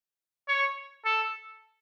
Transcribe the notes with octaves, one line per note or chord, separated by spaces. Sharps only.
C#5
A4